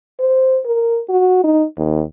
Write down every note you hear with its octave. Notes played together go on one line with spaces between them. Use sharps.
C5
A#4
F#4
D#4
D#2